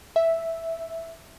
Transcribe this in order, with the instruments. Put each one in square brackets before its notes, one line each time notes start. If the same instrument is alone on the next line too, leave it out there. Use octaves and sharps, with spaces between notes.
[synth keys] E5